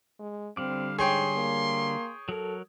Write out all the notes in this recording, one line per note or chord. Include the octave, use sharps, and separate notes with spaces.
G#3
D3 G3 C4 F5 D6
G#2 G#4 C#5 G5 C6
A#3
F#3 A4 A#4